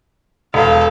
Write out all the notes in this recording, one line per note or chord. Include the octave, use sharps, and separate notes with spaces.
E1 A4 F5